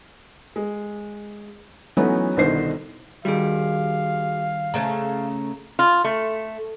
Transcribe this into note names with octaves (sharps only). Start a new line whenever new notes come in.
G#3
E3 F#3 A3 B3 C#4 D#4
C2 B2 D3 D#3 C5 C7
D#3 G3 F#4 G#4 F5
C#3 A3 C#4 A#5
F4
A3